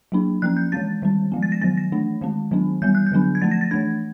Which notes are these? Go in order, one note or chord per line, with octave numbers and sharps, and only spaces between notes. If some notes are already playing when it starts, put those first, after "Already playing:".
F#3 A#3 D4
F3 A#3 C#4 F#6
G6
E3 G#3 C4 A6
D#3 G3 C4
F3 G#3 B3
A6
A#6
D#3 F#3 B3 A6
A#6
E3 A3 D4
D#3 G#3 C4
D#3 F#3 B3 D4
E3 G3 B3 G6
F#6
G6
D3 F#3 B3 D4
G#6
F3 A3 C4 A6
A#6
A6
E3 A3 D4 G#6